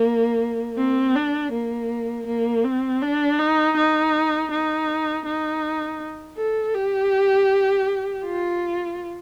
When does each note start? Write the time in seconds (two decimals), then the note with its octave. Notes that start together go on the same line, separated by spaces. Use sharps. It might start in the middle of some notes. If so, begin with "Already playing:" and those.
Already playing: A#3
0.77 C4
1.15 D4
1.52 A#3
2.27 A#3
2.64 C4
3.02 D4
3.39 D#4
3.77 D#4
4.51 D#4
5.25 D#4
6.37 A4
6.74 G4
8.24 F4